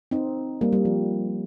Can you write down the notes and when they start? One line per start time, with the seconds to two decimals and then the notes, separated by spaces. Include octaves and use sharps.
0.11 C4 D#4
0.61 G3 A#3
0.73 G3
0.85 F3